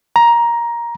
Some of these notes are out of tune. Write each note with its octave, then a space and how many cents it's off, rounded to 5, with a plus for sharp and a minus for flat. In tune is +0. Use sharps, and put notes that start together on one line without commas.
A#5 +10